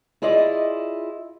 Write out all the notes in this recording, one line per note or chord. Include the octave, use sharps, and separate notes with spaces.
E4 F4 G#4 D5 D#5